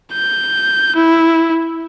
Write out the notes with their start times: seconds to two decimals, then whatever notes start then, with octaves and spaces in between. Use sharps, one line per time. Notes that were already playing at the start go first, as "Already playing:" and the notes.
0.12 G6
0.95 E4